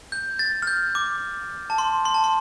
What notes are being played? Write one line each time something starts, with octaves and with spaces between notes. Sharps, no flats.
G6
A6
F6
G6
D6
A5
C6
C6
A5
C6